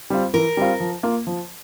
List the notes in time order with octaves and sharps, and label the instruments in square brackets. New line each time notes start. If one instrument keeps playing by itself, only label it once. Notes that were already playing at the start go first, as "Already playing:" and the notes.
[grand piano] G3 C4 F4
[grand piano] E3 [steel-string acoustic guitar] A#4
[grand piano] G3 C4 F4
F3
A#3 F4
F3